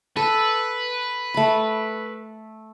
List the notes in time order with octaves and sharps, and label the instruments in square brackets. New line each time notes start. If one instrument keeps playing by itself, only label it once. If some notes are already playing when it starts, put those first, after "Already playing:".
[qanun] A4 [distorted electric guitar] B4
[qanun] A3 B5